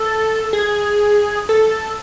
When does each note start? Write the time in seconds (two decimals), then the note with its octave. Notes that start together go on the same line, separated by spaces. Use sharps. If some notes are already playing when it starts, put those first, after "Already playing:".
Already playing: A4
0.53 G#4
1.49 A4